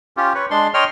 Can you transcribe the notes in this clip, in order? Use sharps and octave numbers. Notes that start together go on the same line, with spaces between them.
C#4 F4 G4
B4 C#5
G#3 D4 C6
C#5 D#5 G5 C6 F6